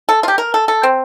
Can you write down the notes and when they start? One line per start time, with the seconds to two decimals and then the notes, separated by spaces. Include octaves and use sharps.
0.09 A4
0.23 F4
0.28 G4
0.38 A#4
0.54 A4
0.68 A4
0.83 C4